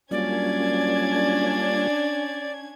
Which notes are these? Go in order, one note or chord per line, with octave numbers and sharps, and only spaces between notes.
F#2 G3 A#3 C#4 D4 F4 D5 G#6